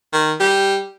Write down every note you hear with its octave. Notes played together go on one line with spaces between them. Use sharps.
D#3
G3